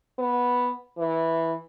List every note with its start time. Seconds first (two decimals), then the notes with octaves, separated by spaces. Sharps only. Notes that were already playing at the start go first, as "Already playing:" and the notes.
0.18 B3
0.98 E3